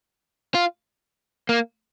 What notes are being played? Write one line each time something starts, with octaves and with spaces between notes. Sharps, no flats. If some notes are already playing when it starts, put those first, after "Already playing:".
F4
A#3